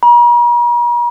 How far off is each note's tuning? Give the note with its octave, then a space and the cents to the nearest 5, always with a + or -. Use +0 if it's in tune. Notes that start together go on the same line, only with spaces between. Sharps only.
A#5 +45